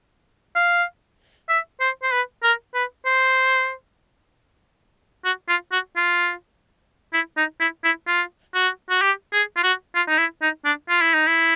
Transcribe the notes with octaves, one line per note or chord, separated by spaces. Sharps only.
F5
E5
C5
C5
B4
A#4
B4
C5
F#4
F4
F#4
F4
E4
D#4
E4
E4
F4
F#4
F#4
G4
G#4
F4
F#4
F4
D#4
E4
D#4
D4
F4
E4
D#4
E4